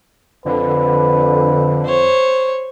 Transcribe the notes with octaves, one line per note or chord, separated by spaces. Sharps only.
F2 D3 B4
C5 C#5